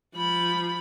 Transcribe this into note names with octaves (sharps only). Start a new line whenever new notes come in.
F3 B5